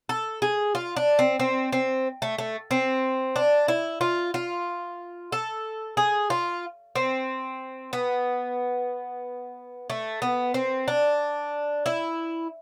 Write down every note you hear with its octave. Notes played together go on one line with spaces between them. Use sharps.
A4
G#4
F4
D4
C4
C4
C4
A3
A3
C4
D4
E4
F4
F4
A4
G#4
F4
C4
B3
A3
B3
C4
D4
E4